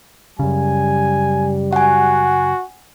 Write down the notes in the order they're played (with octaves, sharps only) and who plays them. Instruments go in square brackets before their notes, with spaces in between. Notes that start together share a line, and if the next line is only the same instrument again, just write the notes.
[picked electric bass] F#2 C#3 [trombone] G3 [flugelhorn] G#5
[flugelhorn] F#4 [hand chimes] F#5 G#5